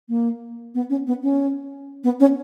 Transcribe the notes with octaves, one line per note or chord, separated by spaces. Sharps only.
A#3
B3
C#4
B3
C#4
B3
C#4